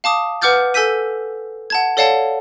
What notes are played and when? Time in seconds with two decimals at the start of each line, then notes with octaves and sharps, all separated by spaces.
0.04 F5 A5 D6 D#6
0.42 B4 F#5 D6 F6 G6 A6
0.74 A4 G#5 E6 G6 B6 D#7
1.70 F#5 A5 G#6
1.97 A4 C#5 D5 F5 F#5 A5